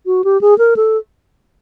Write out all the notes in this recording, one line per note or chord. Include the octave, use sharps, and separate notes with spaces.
F#4
G4
G#4
A#4
A4